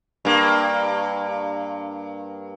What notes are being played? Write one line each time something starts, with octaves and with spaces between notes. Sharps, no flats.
G2 A#3